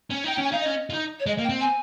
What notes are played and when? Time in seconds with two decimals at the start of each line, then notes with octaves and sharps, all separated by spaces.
0.10 C#4
0.24 D#4 G5
0.35 G5
0.38 C#4
0.43 G#5
0.52 D#4 F5
0.60 D#5
0.65 C#4
0.90 F4
0.93 D#4
1.20 C#5
1.26 G#3 D#5
1.38 A#3
1.44 G5
1.49 C4
1.61 G#5